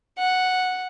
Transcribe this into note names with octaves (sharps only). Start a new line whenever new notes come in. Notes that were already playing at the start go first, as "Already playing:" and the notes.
F#5